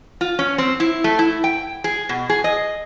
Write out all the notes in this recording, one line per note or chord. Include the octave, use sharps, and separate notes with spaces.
F4
C#4
C4
E4
A3
E4
G5
G#4
B2
G#4
D#5